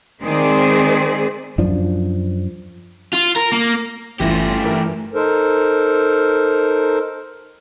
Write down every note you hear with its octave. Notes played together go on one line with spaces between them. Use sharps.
D#3 G#3 C4 G#4 C5 D5
F#2 F3 D4
F4
A#4
A#3
G1 E3 A3 C#4 F4 G4 A#6
G2 E3 A#4
D#4 A4 A#4 C5